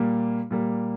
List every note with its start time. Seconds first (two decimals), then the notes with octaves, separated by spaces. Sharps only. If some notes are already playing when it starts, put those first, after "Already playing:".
Already playing: A#2 G3 A#3
0.51 A#2 G3 A#3